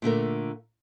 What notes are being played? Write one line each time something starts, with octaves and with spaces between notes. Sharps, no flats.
A#2 D3 A3 A#4